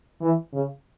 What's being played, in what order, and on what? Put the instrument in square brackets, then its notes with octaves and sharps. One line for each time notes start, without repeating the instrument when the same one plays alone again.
[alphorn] E3
C#3